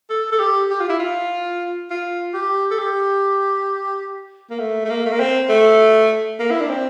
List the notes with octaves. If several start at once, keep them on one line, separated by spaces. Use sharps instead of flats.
A4
A4
G4
G4
F4
E4
F4
F4
G4
A4
G4
A#3
A3
A3
A#3
A3
A#3
C4
A3
A#3
E4
D4
C4